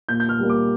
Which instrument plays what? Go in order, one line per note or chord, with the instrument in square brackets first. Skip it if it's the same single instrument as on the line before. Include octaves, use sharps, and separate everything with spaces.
[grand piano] A#2 G6
G6
F6
G3 A#3
D6